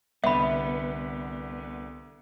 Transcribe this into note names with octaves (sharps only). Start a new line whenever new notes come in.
C2 D3 B3 E5 B5